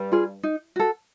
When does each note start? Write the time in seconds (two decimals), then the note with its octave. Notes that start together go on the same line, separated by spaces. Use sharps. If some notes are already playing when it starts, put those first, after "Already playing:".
Already playing: G2 G3
0.12 F4 G#4
0.43 D#4
0.76 F#4 A4